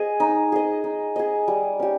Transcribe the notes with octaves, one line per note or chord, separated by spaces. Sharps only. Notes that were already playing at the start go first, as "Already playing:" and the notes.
Already playing: G#4 D#5
D#4
G#4 D#5
D#4
G#4 D#5
G3
C#4 G4